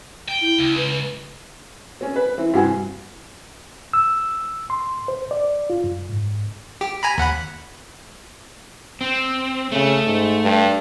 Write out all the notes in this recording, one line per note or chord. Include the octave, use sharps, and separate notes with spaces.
G5
E4
C#2
B4
C4 C#4
B4
E3 C4 E4
G2 C3 E3 F#4 G#5
E6
C6
C5
D5
F4
F#2
G#2
G4
G#5 A#5 B5
D#2 F#5 B5
C4
C#3 A3
G#2
G2